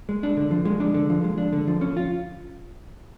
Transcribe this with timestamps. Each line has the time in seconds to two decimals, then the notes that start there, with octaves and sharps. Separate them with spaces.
0.09 G#3
0.23 D4
0.37 D3
0.51 F3
0.65 G#3
0.80 D4
0.94 D3
1.10 F3
1.24 G#3
1.38 D4
1.53 D3
1.68 F3
1.81 C#4
1.97 F4